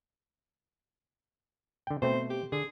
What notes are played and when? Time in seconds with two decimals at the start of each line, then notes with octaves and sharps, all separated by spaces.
1.87 D3 G5
2.02 B2 A3 C4 C5
2.30 G4
2.52 D3 G#4